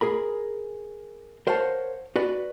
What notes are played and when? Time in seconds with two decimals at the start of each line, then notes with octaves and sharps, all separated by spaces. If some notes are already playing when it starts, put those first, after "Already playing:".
0.01 G#4 A#4 B5
1.47 A#4 C5 C#5 F5 F#5 A5
2.16 F#4 B4 D5